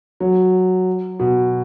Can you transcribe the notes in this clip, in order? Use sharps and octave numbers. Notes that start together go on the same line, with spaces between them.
F#3
B2